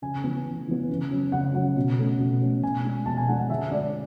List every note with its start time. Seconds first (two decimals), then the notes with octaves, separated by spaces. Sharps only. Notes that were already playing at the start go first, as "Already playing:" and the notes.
0.02 C#3 G#5
0.24 E3 B3
0.46 C#3
0.68 E3 B3
0.89 C#3
1.11 F#3 C#4
1.32 C#3 F#5
1.54 F#3 C#4 F#5
1.76 B2
1.98 A3 C#4
2.20 B2
2.41 A3 C#4
2.62 B2 G#5
2.85 G#3 D4
3.06 B2 A5
3.17 G#5
3.28 G#3 D4 F#5
3.39 F#5
3.50 D3 E5
3.71 G#3 D4 D5